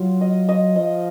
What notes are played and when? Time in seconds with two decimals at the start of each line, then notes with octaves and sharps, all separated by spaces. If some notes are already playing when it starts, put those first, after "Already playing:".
Already playing: F#3 F4
0.21 D#5
0.49 D#5
0.76 F3 D#5